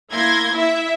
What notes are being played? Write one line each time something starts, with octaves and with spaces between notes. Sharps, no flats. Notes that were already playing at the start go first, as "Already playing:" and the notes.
A#3 E4 C6 G#6 A#6
E4 E5